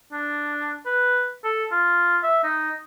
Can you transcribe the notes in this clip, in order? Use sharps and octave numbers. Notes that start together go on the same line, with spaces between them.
D4
B4
A4
F4
E5
D#4